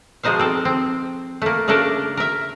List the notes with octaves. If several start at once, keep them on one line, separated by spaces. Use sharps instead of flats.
B2 F3 G#3 D#4 C5 F5
C4 A4
C4
A3 A#3
C#3 A3 A#3 D4 A4 A#4
A#4 E5